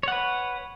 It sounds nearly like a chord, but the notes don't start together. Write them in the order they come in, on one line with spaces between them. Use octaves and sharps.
C#5 F#5 B4